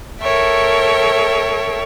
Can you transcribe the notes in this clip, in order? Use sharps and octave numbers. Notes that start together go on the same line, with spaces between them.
A4 A#4 C#5 E5 G5